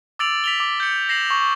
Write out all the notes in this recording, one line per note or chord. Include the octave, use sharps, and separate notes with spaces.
D6 E6 A6 D7 F7 F#7
B6 F7 G7
D6
G6 C#7
A#6 C7 E7 F#7
C#6